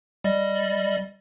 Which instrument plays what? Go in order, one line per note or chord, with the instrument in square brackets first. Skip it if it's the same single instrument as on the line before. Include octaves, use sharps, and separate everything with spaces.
[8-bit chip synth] G3 D5 D#5